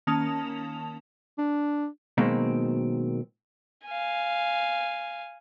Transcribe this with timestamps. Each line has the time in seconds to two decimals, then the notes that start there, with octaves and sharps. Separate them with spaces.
0.07 D#3 A#3 C#4 A5 D#6 F7
1.38 D4
2.18 B2 D#3 F#3 G#3 A#3 C4
3.87 F5 G#5